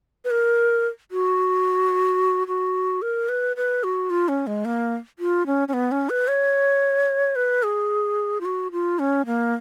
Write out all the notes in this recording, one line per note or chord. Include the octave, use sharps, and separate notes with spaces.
B4
A#4
F#4
F#4
A#4
B4
B4
F#4
F4
C#4
G#3
A#3
F4
C#4
C#4
B3
C#4
B4
C#5
B4
G#4
F4
F#4
F4
C#4
A#3